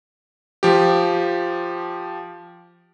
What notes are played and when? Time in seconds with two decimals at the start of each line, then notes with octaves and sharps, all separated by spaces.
0.63 F3 G4